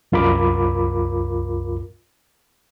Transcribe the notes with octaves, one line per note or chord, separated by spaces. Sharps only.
C2 F#2 F4 A#4 B5 D6